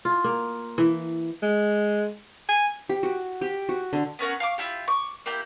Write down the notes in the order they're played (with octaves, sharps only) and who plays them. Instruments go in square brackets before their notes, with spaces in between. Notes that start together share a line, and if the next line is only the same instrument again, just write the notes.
[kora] F4
A#3
E3
[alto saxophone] G#3
G#5
[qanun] G4
F#4
G4
F#4
D3
[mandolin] B3 C#4 A#4 F#5
F5 C#6 D6
E4 F4 G4
C#6 D6
A#3 E4 G4 G6